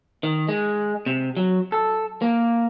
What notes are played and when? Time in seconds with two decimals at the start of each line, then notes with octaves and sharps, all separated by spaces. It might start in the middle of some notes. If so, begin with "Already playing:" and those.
0.23 D#3
0.49 G#3
1.06 C3
1.37 F#3
1.72 A4
2.22 A#3